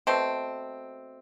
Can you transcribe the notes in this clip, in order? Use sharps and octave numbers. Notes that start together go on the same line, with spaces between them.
B2 A3 C4